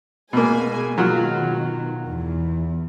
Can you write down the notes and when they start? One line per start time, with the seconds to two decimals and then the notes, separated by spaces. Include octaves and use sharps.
0.33 B2 G#3 A#3 G#5
0.98 B2 D#3 F#3 F4 F#4
2.08 E2